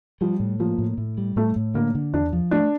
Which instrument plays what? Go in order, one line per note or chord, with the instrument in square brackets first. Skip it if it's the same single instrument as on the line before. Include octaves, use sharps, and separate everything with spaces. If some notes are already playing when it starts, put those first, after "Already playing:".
[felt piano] F3 [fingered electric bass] G3
[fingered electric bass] A2
[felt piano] F3 [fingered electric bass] A#3
[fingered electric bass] A2
A2
G3
[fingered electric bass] A2 [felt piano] A3
[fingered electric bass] A2
[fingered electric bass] D3 [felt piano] A#3
[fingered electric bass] D3
[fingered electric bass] E2 [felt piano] D4
[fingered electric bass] F3
[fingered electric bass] A3 [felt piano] D4